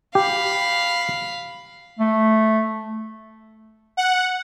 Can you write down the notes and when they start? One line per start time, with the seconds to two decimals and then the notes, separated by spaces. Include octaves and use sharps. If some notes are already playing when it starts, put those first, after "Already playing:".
0.15 G4 F5 B5
1.99 A3
3.97 F#5